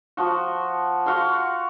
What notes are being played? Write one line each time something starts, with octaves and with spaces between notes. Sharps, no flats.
F3 F#4
F#4 F5 C6 C#6